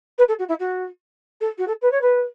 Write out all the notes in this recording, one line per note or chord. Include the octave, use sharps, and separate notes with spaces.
B4
A4
F#4
E4
F#4
A4
F#4
A4
B4
C#5
B4